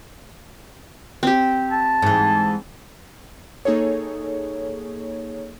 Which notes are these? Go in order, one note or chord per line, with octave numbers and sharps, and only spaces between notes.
C4 G4
A5
G#2 E3
A#3 D#4 G#4 A4 C#5